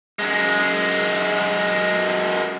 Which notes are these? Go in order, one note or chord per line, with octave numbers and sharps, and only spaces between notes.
F#2 G#3